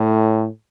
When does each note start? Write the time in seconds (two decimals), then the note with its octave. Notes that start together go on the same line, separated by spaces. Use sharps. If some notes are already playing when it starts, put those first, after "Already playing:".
Already playing: A2